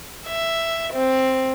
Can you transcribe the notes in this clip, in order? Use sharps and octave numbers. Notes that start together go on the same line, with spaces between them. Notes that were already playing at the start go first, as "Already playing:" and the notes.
E5
C4